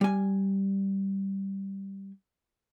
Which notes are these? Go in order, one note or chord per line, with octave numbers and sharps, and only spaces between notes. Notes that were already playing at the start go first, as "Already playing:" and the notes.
G3 G#5